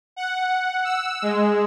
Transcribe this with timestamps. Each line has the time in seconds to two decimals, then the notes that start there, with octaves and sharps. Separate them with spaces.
0.16 F#5
0.84 E6
1.22 G#3